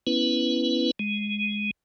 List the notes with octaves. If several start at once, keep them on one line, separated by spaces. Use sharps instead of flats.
B3 C#4 E4 B4
G#3